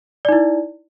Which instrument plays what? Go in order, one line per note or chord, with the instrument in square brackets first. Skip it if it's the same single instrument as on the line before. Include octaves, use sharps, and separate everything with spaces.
[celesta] D5
D#4
E4